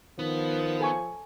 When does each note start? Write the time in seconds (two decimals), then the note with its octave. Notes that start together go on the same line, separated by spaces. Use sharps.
0.19 D#3 F3 B3
0.80 A4 G#5 C#6